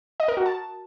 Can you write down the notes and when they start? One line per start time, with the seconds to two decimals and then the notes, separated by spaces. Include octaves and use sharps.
0.20 D#5
0.28 A#4
0.37 F#4
0.46 A5